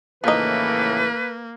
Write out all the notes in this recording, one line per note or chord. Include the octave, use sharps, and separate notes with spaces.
A2 C#3 E3 F3 A#3 D#4 B4